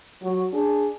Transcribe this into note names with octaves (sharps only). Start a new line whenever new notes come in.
F#3 F#4
D4 G#4